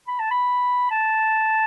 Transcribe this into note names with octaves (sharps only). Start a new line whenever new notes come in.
B5
A5
B5
A5